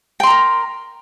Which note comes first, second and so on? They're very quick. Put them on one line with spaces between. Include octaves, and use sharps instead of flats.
G5 C6 A#5 A#4